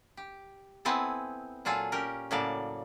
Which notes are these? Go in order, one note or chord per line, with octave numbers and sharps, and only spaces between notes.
G4
B3 C4 E4 G#4 A4
A#2 F#3 F4 G#4 A4
C#4 G4 A#4
A2 C#3 F#3 A#3 A4 D5